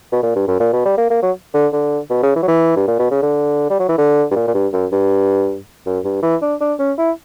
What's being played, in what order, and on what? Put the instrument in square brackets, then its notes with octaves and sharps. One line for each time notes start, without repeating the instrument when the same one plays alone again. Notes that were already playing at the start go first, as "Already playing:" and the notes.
[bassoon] B2
A#2
G2
F#2
A#2
B2
G3
A#3
A#3
F#3
D3
D3
B2
C#3
E3
F#3
E3
G2
A#2
B2
C#3
D3
G3
F#3
E3
D3
G2
A#2
A#2
G2
F#2
G2
F#2
G2
E3
D4
D4
C#4
E4